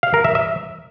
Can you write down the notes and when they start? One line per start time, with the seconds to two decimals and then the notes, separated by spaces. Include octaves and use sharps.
0.03 F5
0.14 A#4
0.24 E5
0.35 E5